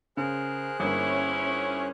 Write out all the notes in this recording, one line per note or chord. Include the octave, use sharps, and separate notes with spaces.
C#3 G#4 A#4 C5 F#6
G1 A#3 C#4 E4